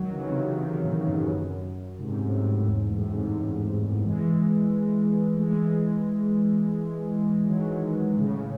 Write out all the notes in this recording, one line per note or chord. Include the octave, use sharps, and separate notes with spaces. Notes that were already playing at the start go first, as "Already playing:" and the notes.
Already playing: D#3 F#3
C#3 E3
C3 D#3
C3 D#3
A2 C#3
F#2
F#2
G#2 C3
C3
F#2 A2
F#2
E2 G#2
F#2 A2
G#2 C3
E3 G#3
A3
E3 G#3
D#3 F#3
A2 C#3